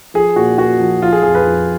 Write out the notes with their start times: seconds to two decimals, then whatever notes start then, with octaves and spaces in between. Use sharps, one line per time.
0.14 F3 G#4
0.36 A#2 F#4
0.58 A#2 F#4
0.80 F3
1.02 F3 F4
1.12 G#4
1.23 F2 G#4
1.35 B4
1.45 F2